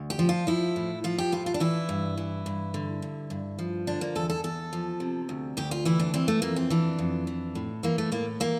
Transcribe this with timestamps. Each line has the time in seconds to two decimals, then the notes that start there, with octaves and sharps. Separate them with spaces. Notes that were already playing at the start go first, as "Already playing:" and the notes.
Already playing: D2
0.10 G4
0.19 F3
0.29 F4
0.47 F3 E4
0.76 A2
1.04 F3 F4
1.18 G4
1.32 A2 F4
1.46 F4
1.54 D4
1.60 E3 E4
1.89 G2
2.17 E3
2.46 G2
2.74 D3
3.02 G2
3.30 G2
3.59 F3
3.87 D3 D4
4.01 A#3
4.15 E2 A4
4.30 A4
4.44 E2 A4
4.73 F3
5.00 C3
5.29 D2
5.57 D2 G4
5.71 F4
5.85 E3 E4
6.00 D4
6.14 E3 C4
6.28 A3
6.42 F2 A#3
6.56 C4
6.70 E3 D4
6.99 F2
7.27 E3
7.55 A2
7.83 E3 A#3
7.98 A3
8.12 A2 A#3
8.40 E3 A#3